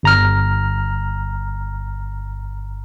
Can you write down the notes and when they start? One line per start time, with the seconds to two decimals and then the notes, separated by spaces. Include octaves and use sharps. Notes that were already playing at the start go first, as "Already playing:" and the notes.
0.03 G1 A#5 F6